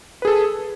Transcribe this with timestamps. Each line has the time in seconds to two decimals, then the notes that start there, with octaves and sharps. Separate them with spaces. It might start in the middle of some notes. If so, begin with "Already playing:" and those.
0.22 B4
0.25 G#4
0.27 A4